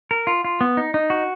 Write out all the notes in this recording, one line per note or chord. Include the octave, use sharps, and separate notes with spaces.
A#4
F4
F4
B3
D#4
D#4
F#4